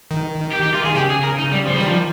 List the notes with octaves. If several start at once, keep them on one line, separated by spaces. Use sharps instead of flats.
D#3
G4
G4
F4
G#4
C#3 G4
G#4
A#4
D#4
G3
F3
D#3 G3
F3